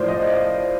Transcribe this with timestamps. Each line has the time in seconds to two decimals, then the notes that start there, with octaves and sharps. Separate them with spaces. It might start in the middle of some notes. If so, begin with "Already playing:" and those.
Already playing: A2 F3 C5 D5
0.08 D#5